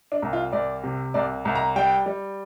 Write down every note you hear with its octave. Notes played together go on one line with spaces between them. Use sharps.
D4
C2
F4
C2 D5
C3
C2 D5
C2
A#5
G3 G5
G3